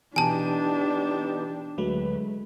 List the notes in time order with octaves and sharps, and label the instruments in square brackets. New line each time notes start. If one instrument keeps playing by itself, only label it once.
[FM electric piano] B2 E3 [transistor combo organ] B3 D#4 G4 [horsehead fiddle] D4 [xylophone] G#5 A5
[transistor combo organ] D2 B4 [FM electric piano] F#3 G#3 A3